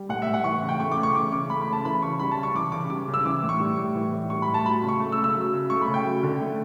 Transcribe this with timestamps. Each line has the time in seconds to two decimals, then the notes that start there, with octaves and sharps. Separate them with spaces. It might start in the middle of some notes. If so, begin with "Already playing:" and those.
Already playing: G3
0.09 A2 F#5
0.22 A2 E5
0.34 F#5
0.44 E3 C#6
0.62 C#3
0.69 G5
0.80 A3 C#6
0.92 D6
0.97 C#3
1.03 C#6
1.15 E3 D6
1.32 C#3 D6
1.49 A3 B5
1.62 B5
1.67 C#3
1.73 A5
1.85 E3 B5
2.02 C#3 C#6
2.19 G3 B5
2.31 A5
2.37 C#3
2.43 C#6
2.55 E3 D6
2.72 C#3 D6
2.90 G3 D6
3.08 C#3
3.14 E6
3.25 E3 D6
3.43 A2
3.49 C#6
3.60 G3
3.77 A2
3.96 E3
4.13 A2
4.30 G3 C#6
4.42 B5
4.48 A2
4.54 A5
4.65 F#3 B5
4.83 C#3
4.89 C#6
5.00 A3
5.12 E6
5.18 C#3
5.24 E6
5.35 F#3
5.53 C#3
5.70 A3 C#6
5.82 B5
5.88 C#3
5.94 G5
6.05 F#3
6.23 D3
6.41 A3